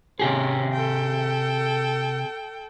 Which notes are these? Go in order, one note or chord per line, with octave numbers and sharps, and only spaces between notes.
C3 C#4 G4 G#4
A4 G5